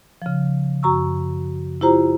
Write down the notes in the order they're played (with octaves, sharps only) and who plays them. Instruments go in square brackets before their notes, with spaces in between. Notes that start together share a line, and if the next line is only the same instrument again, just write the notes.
[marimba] C#3 F3
F#2 F#4 A#5 C#6 E6
E4 F4 G4 C5 A#5